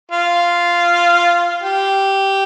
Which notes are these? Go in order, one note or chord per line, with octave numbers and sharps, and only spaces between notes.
F4
G4